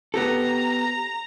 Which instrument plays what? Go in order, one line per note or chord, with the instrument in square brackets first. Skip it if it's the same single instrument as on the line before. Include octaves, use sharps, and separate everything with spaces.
[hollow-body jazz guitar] B3 G4 A4 [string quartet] A#5